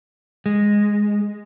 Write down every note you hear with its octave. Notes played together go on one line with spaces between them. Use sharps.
G#3